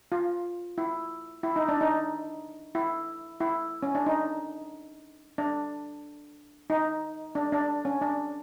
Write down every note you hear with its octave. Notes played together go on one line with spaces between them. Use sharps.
F4
E4
E4
D#4
D4
D#4
E4
E4
C#4
D4
D#4
D4
D#4
D4
D4
C#4
D4